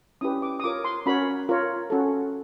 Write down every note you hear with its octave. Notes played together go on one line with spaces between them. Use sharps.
C#4 E4 G4 B4 D#6
D6
D#6
F4 A#4 C#5 D6
C6
C#4 F#4 A#4 C#5 B5
F4 A#4 C#5
C#4 F#4 A4